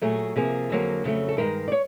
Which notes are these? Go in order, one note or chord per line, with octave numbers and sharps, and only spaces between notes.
A#2 F#3 A3 G#4
C3 F3 A#3 G#4
F2 D3 F#3 A#3
F2 C#3 F#3 A3
A4
G2 D#3 G#3 A#4
D5
C#5